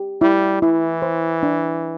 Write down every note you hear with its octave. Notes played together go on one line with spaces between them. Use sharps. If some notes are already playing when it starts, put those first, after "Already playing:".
Already playing: G4
G3 E4
E3 E4
C5
D4